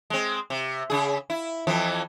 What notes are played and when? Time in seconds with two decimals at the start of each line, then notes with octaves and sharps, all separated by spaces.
0.10 G#3 C4
0.50 C3
0.90 C#3 G#4
1.30 E4
1.67 F2 E3 F3